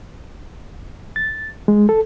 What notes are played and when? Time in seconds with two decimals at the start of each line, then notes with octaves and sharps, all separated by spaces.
1.16 A6
1.68 G#3
1.89 A4